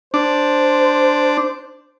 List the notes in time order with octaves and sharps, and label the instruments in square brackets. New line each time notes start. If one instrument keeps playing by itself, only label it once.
[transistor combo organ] D4 [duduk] C5